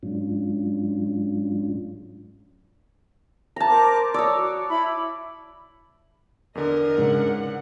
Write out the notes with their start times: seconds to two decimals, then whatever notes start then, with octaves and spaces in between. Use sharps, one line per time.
0.03 G#2 F#3 G#3 C#4 D4 F4
3.56 A5 A#5
3.68 A#4 C5 D6
4.14 C#5 D5 D#6 E6
4.36 F#4
4.69 E4 B5
6.55 E2 D3 A#4 D#5
6.98 G#2 C#3 F#5